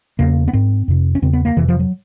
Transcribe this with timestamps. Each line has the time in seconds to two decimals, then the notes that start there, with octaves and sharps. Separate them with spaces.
0.19 E2 C#3 A#3
0.48 B3
0.53 G#2 C4
0.88 F2 C3
1.15 C#4
1.22 E2 C#3 C4
1.33 B3
1.45 A#3
1.56 F2 C3 E3
1.68 F3
1.79 F#3